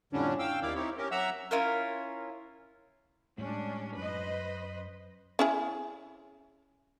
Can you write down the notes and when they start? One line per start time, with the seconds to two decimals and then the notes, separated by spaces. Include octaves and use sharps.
0.13 F2 A2 D3 G3 C#4 D4
0.39 F5 G5 E6
0.62 D#2 D#3 E4 D5 F5
0.75 C4 D#4 E4 G4 C#5
0.97 C#4 G4 A#4
1.11 F#3 E5 F#5 A#5 E6
1.51 C#4 E4 F4 A#4
3.38 A2 G3 G#3 C#4 D4
3.97 F#2 B4 C5 D#5
5.39 C#4 E4 G#4